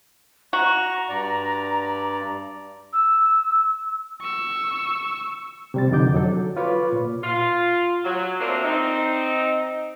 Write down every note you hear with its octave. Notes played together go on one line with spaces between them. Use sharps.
F#4 A#5 C#6
G2 D5
E6
C#6 E6
C3 G3 A6
F2 D3 D#4 D6 G6
F#3 A4
F4 B4 C#5 B5 C#6 D6
A#2
F4
F#3
A3 A#3 C4 D4 F4 E5
C4 D#4